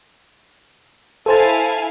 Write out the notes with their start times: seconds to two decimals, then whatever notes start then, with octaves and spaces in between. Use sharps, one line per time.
1.26 E4 A4 C5 F5 G#5 A5